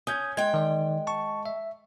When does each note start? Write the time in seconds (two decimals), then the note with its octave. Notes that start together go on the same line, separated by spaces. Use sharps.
0.07 C#4 D#6 G6 G#6
0.37 G#3 G5 G#6
0.54 D#3 D5
1.07 A5 C#6
1.46 E5